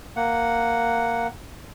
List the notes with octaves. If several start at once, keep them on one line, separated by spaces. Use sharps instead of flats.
A#3 F#5